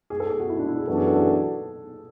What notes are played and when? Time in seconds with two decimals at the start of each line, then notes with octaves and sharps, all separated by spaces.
0.10 G#4
0.20 A4
0.30 G#4
0.40 F#4
0.49 E4
0.59 D4
0.68 E4
0.78 G#4
0.87 F#2 E3 B3 D4 F#4 A4
0.98 G#4
1.07 A4
1.17 G#4
1.27 A4